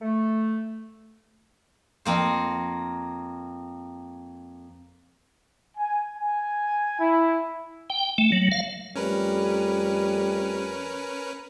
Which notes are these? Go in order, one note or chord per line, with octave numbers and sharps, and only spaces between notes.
A3
F2 A#3 C5
G#5
G#5
E4
G5
A3
F#3
F5
F2 G3 A3 C#4 A#4 B4